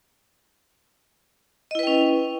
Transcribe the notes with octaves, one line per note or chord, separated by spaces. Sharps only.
C#4 E4 B4 D#5 G5